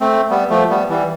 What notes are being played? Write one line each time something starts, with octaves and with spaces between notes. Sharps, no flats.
A3 C4
G3 B3
F3 A3
G3 B3
E3 G3